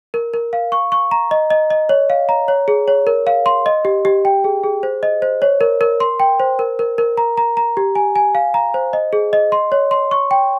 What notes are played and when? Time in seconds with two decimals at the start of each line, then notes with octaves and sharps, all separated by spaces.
0.14 A#4
0.34 A#4
0.53 F5
0.72 C#6
0.92 C#6
1.11 A#5
1.31 D#5
1.50 D#5
1.70 D#5
1.89 C#5
2.10 F5
2.29 A#5
2.48 C#5
2.68 G#4
2.88 C#5
3.07 A#4
3.27 F5
3.46 C6
3.66 D#5
3.85 G4
4.05 G4
4.25 G5
4.44 G#4
4.64 G#4
4.83 C5
5.03 D#5
5.22 C5
5.42 C#5
5.61 A#4
5.81 A#4
6.00 C6
6.20 G5
6.40 C5
6.59 A#4
6.79 A#4
6.98 A#4
7.17 A#5
7.38 A#5
7.57 A#5
7.77 G4
7.95 G#5
8.16 G#5
8.35 F5
8.54 A#5
8.74 C5
8.93 D#5
9.13 G#4
9.33 D#5
9.52 C6
9.72 C#5
9.91 C6
10.11 C#6
10.31 G5